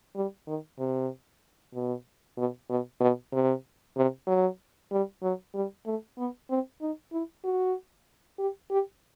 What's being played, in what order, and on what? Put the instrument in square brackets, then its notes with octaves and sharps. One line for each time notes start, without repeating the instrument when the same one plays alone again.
[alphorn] G3
D#3
C3
B2
B2
B2
B2
C3
C3
F#3
G3
F#3
G3
A3
B3
C4
D#4
E4
F#4
G4
G4